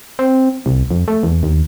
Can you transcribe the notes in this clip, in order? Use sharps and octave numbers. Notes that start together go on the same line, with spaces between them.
C4
C2
F2
A3
E2
D#2